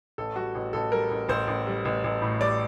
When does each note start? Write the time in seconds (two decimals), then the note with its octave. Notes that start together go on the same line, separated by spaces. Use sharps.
0.18 A1 A4
0.36 G3 F#4
0.55 A1
0.73 A1 A4
0.92 G3 A#4
1.11 A1
1.29 A1 C5
1.47 A1
1.67 G3
1.85 A1
2.04 A1
2.22 A2
2.41 G3 D5